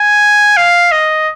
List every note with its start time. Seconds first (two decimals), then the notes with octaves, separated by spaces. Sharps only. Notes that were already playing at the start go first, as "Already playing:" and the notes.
Already playing: G#5
0.57 F5
0.92 D#5